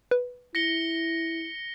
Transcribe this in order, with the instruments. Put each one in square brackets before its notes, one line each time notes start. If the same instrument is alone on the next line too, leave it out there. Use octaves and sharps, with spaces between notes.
[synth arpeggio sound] B4
[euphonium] E4 [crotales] A#6 C#7 G7